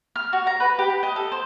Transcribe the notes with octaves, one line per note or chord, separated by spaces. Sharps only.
F6
F#4
A#5
B4
G4
G4
D#5
A4
C5